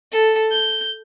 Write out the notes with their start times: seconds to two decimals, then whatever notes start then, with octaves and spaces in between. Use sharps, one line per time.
0.12 A4
0.52 G6